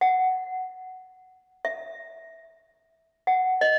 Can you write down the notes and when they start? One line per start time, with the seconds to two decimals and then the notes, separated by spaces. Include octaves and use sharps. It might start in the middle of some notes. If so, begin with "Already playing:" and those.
0.01 F#5
1.65 E5
3.27 F#5
3.61 D#5